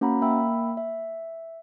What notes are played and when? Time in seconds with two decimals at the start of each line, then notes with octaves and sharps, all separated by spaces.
0.01 A#3 C#4 F#4 F#5 A#5 B5
0.22 A#3 E5 G5 B5 E6
0.77 E5